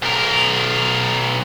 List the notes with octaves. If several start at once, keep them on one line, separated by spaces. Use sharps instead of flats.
B1 A#4